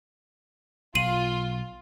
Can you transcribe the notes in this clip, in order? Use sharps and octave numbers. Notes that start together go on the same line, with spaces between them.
B1 F4 C7 D#7 F#7